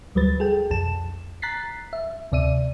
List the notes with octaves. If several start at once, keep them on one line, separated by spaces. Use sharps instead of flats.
D2 F#3 G3 B4 A6
G#4 A4 G5
B1 F2 A5 E7
A#5 F#6 A6 B6 C7
E5
D2 C3 D5 E5 D#7